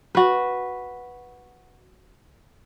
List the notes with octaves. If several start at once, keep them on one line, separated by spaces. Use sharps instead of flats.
F#4 B4